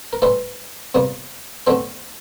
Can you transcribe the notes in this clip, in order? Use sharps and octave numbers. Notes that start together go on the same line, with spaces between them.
A#4
A2 E3 G3 A4 C5
E2 C3 G3 A#3
E2 D3 A3 C4 A4 C5